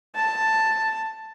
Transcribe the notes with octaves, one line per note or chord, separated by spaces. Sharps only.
A5